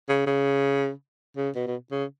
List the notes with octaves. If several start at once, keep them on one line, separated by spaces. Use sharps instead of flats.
C#3
C#3
C#3
B2
B2
C#3